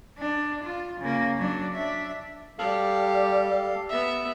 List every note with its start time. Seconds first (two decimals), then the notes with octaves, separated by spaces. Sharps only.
0.18 D4
0.63 F4
1.00 C#3 A#3
1.38 F#3 D4
1.75 D4 E5
2.59 G3 G4 A4 F5
3.89 B3 E5